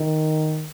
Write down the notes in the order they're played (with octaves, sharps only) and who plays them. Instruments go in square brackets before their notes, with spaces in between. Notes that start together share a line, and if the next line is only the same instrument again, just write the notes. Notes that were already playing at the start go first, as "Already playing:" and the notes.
Already playing: [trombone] D#3